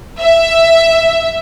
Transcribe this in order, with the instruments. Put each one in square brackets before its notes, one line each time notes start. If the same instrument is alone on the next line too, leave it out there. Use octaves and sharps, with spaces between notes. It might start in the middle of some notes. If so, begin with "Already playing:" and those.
[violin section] E5